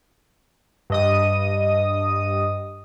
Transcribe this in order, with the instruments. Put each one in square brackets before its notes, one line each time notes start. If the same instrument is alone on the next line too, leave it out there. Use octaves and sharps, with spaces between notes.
[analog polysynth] G2 D#5 D#6